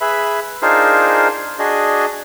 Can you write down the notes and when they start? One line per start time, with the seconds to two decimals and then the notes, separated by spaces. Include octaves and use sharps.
0.01 G#4 B4 E5 B5
0.62 D4 D#4 F4 G#4 A#4 C5
1.59 D4 F#4 G#4 D#5